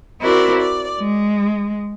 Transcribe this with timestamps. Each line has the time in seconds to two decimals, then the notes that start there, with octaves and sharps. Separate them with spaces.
0.20 C4 E4 F#4 A#4 D5
0.58 D5
0.99 G#3